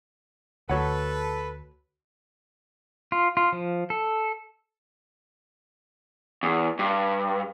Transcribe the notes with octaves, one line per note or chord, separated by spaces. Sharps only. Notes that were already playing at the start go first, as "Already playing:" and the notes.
D2 F#4 A4 B4 C#5 F#5
F4
F4
F3
A4
E2
G2